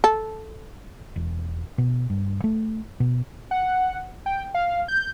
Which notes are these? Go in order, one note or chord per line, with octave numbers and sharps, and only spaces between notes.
A4
E1
B2
G2
A3
B2
F#5
G5
F5
G6